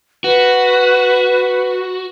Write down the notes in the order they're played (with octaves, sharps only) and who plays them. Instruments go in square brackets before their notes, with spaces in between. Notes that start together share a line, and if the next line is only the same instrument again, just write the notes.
[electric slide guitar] F#4 [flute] B4